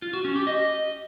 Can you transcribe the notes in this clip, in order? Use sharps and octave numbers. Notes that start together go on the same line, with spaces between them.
F4
F#4
C#4
G4
D#5